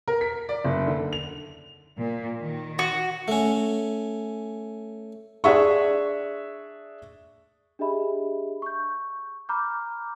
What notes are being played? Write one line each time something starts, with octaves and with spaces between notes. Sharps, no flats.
A#4
B6
D5
F#1
D3
F7
A#2
D#3
F#4
A3 C#4
D4 G#4 E5 C#6
D4 G4 G#4 D#5 E5 B5
C#6 G6
A#5 B5 D6 F6 G6